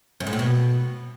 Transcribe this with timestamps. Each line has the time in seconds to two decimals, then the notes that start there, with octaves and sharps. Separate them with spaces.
0.20 F#2
0.27 G#2
0.33 A2
0.39 B2